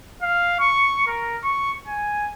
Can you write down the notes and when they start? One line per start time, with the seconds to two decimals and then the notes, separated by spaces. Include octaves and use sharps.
0.22 F5
0.60 C#6
1.07 A#4
1.44 C#6
1.87 G#5